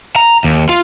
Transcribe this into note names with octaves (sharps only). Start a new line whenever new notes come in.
A#5
D#2
F4